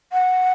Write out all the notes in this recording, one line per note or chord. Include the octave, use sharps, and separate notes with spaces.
F#5